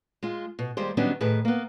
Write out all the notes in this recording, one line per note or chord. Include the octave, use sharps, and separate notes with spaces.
G#3 F4
B2
D#2 G3 G#3 G4 C5
D#3 F#3 G3 B3 C#4 D4
A2 D#3 G#4 B4
A#3 B3